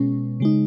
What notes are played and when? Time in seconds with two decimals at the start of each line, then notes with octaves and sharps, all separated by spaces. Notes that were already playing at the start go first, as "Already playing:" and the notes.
Already playing: B2 G#3 C#4
0.40 C#3 G#3 D#4